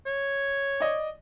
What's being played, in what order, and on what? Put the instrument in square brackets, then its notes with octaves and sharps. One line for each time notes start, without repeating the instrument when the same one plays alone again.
[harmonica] C#5
[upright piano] D5 D#5